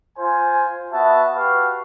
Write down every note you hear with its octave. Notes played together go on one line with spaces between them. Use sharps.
F4 C5 G#5
B3 F#4 E5 A5
F#4 G4 B4 F5